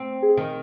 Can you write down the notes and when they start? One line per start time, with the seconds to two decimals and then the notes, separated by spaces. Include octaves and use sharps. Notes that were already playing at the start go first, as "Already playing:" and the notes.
Already playing: C4
0.22 G#4
0.37 D#3